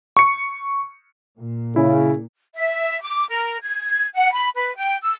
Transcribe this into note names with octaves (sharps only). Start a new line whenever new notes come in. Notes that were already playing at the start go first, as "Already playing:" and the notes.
C#6 C#7
A#2
C#3 E4
E5
D6
A#4
G#6
F#5
B5
B4
G5
E6